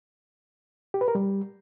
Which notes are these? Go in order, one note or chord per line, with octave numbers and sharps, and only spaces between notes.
G4
B4
A#4
G3